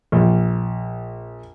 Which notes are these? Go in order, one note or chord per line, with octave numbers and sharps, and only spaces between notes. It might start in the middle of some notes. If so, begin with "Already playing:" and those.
A#1